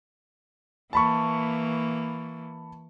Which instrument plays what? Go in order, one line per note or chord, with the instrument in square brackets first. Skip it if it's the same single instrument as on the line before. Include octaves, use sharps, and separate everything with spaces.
[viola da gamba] E3 A#3 [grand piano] A5 B5 C#6